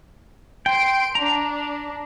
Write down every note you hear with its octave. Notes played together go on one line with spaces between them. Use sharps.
G5 C6 D7
D4 A#5